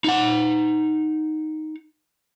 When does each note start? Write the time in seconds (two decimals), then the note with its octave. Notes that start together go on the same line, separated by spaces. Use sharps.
0.04 D#4 F#5